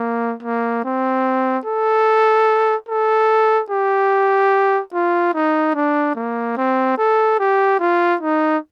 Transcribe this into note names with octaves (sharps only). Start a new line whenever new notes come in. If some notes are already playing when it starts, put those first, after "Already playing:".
Already playing: A#3
A#3
C4
A4
A4
G4
F4
D#4
D4
A#3
C4
A4
G4
F4
D#4